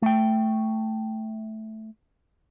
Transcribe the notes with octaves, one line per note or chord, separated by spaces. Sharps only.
A3 G5